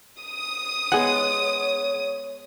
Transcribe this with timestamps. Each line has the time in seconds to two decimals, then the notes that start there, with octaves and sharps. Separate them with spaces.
0.20 D#6
0.92 G#3 B3 G#4 C#5 D#5 F#5